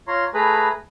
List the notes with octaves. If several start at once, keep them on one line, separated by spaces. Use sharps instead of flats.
F4 C#5 A#5 C6
A3 G#4 B4 A#5 B5